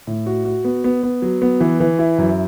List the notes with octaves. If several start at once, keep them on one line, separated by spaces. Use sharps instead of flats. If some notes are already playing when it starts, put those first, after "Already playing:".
A2
F#4
F#4
B3
B3
B3
F#3
B3
E3
E3
E4
F#2